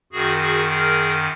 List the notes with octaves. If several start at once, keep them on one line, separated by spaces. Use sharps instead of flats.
F#2 D#3 F#4 G#4
F#4 G#4
G#4 A#4